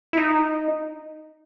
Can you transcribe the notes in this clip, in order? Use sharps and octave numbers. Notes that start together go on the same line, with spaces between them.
E4
D#4